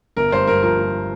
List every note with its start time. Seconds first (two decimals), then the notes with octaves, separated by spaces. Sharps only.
0.17 G1 A#4
0.32 G2 C5
0.47 G2 A#4
0.63 F3 A#4
0.78 F3